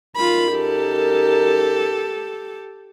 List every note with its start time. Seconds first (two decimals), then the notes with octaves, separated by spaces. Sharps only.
0.16 F#2 D#4 F4 A#4 B5
0.54 G4 A4